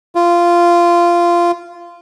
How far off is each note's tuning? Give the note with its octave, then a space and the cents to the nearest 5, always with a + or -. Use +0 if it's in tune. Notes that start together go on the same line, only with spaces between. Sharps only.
F4 -15